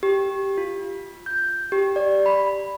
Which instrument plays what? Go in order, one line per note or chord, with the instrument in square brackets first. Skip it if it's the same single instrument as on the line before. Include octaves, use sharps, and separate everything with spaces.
[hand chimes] G4
F4
G6
G4
D5
B5